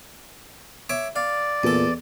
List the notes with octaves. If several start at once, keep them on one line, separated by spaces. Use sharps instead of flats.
C#5 E5 D6
D5 F5
E2 A#2 A4